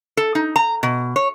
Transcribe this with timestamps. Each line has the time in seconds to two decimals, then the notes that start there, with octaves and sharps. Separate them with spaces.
0.17 A4
0.35 D#4
0.56 A#5
0.83 B2
1.16 C#5